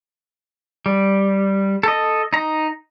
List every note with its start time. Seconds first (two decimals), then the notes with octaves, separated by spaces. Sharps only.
0.86 G3
1.83 A4 D#5
2.33 D#4 A#5